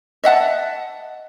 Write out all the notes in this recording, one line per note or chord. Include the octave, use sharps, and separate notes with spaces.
D#5 E5 F#5 A5